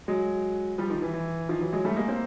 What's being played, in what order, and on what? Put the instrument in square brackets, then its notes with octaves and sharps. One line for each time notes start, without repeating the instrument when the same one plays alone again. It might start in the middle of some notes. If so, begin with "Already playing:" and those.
[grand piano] F#3 G#3
F3 G3
D#3 F3
E3
E3
D#3 F3
E3 F#3
F#3 G#3
G3 A3
G#3 A#3
A#3 C4